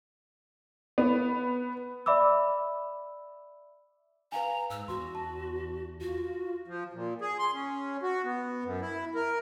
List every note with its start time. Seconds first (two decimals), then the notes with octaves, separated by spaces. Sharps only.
0.98 B3
2.06 D5 E5 B5 D6 E6
4.32 B4 F5 G#5 A#5
4.70 G#2 E6
4.88 E2 F#4 C6
5.15 A5
6.01 F4 F#4
6.68 F3
6.93 A#2
7.21 G#4
7.39 C6
7.53 C#4
8.03 F#4
8.25 B3
8.64 F#2
8.81 E4
9.15 A#4